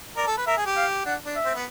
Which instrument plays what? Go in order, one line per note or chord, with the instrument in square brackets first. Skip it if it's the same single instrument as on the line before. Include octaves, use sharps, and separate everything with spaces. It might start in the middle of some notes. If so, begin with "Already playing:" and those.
[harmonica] A#4 [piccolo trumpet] D5
[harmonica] A4
B4
[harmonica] A#4 [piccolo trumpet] E5
[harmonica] G#4
G4
[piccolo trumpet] F5
[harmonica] D4 [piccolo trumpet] F#5
[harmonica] D4
[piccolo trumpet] E5
[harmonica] C4
B3